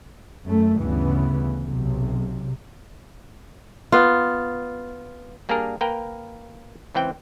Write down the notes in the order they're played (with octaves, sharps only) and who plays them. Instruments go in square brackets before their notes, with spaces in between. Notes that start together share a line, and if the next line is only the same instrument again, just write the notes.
[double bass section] F#2 A3
D2 G2 C#3 E3 B3
B1 C3
[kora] B3 F4
[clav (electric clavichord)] G3 A#3 D4 G#4 A#4
A#3 A#4 B4 G5
C#2 E3 C4 G5